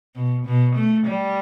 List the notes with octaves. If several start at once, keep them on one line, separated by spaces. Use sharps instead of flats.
B2
B2
A3
G3